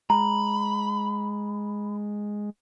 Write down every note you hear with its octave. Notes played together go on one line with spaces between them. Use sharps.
G#3 A#5 B5